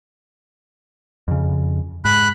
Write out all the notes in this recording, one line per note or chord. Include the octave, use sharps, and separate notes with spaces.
F2 C#3
G#2 B5 F#6